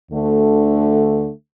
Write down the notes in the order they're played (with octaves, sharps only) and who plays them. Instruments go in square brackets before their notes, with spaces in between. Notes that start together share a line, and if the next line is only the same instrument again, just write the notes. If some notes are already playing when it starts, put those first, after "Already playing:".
[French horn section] D2 D3 A3